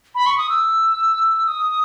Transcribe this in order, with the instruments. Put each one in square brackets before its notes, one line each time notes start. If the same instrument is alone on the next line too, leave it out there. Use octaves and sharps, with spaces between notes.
[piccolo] B5
C#6
D#6
E6
D#6